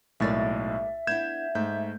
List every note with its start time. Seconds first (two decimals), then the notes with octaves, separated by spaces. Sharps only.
0.20 B1 A2 G#3 A#3 D5 E5 A6
1.07 B3 D4 E4 G6 G#6 E7
1.55 G#2 A3 G6